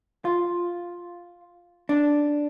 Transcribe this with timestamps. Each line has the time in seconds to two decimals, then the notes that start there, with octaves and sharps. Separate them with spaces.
0.25 F4
1.89 D4